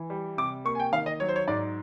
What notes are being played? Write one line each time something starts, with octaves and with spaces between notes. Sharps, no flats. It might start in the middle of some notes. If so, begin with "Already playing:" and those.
Already playing: E3
G3
C3 D6
A#3 C#6
G#5
G5
D#3 F5
D#5
F#3 C#5
C5
C#5
G#2 D5